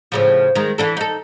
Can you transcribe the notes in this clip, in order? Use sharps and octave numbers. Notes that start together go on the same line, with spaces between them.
A2 C#3 F3
D#3 G#3
E3 D4 A4
D#4 A4